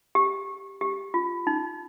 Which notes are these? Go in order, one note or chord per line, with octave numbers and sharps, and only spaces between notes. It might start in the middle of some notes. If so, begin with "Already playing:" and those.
G4
G4
F4
D#4